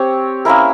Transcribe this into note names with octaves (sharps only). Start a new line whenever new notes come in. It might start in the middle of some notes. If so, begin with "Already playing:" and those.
Already playing: C4 G4 C#5
A#3 C#4 E4 A#4